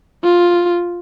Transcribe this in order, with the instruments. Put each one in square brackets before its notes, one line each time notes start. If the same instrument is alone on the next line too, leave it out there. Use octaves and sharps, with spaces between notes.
[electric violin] F4